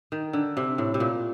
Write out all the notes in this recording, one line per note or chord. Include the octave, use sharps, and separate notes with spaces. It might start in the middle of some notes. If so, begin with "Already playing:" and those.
D#3
D3
C3
A2
C3
A#2